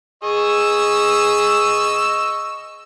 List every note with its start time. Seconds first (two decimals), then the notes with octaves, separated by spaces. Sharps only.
0.24 G#4 D#5 C#6 E6